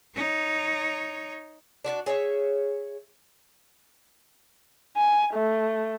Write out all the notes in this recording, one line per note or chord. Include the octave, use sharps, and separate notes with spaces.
D#4 C#5
D4 F#4 B4 D5
G#4 C#5 D#5 E5
G#5
A3